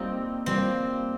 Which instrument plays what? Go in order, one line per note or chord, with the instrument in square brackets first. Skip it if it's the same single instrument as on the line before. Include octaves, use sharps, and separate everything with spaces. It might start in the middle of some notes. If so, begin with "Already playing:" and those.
Already playing: [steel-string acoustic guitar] G3 A#3 F4 [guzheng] C4 D#4
[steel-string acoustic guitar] G3 A#3 F4 [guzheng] C4